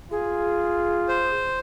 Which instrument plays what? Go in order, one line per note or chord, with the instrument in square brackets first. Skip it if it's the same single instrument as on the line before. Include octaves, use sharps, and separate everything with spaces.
[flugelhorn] F4 [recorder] G#4
[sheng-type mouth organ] C5